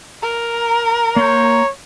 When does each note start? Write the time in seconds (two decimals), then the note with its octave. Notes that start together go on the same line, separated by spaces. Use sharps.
0.23 A#4 A#5
1.16 A#3 C#5 C6 G6